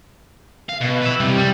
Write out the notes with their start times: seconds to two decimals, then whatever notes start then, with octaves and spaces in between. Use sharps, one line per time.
0.69 F5
0.81 B2
1.02 B4 E5
1.20 C3 G3
1.36 G3